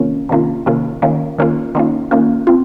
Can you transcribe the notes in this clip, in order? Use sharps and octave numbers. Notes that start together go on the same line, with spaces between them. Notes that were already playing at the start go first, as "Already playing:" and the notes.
Already playing: C3 D#3 A#3 C#4 F4
C3 D#3 A#3 C#4 F4
C3 D#3 A#3 C#4 F4
D#3 A#3 C#4 F4
D#3 A#3 C#4 F4
D#3 A#3 C#4 F4
D#3 A#3 C#4 F4
C4 F4